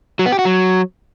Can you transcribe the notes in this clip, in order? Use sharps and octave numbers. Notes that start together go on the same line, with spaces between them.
F#3
B3
G4
F#4
F#3